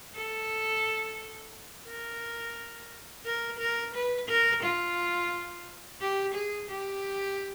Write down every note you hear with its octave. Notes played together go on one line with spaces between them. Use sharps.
A4
A#4
A#4
A#4
B4
A#4
F4
G4
G#4
G4